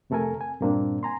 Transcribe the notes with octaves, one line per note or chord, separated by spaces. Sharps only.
F2 C3 A3 A4 A#4 G#5
G#5
G2 A#2 A#3 C4 D4
G#5 A#5 C6